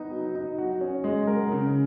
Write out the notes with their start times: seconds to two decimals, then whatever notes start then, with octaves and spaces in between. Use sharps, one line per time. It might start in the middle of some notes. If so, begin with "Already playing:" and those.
Already playing: B3 D#4
0.11 F#3
0.35 D#4
0.58 F#4
0.81 C#4
1.04 G#3
1.27 A#4
1.52 C#3